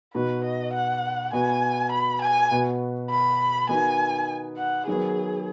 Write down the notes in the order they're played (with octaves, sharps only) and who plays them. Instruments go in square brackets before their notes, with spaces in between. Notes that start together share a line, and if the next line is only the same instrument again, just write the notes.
[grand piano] B2 B3 D#4 F#4 [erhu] B4
[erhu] D#5
F#5
[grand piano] B2 B3 F#4 [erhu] G#5
[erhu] B5
G#5
[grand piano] B2 B3 F#4
[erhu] B5
[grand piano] D#3 B3 D#4 F#4 [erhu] G#5
[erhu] F#5
[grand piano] D#3 F#3 B3 [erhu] G#4